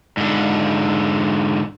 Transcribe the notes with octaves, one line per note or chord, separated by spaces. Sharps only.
G#2 D3